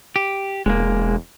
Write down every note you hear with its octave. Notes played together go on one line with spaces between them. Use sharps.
G4
E1 G#3 A#3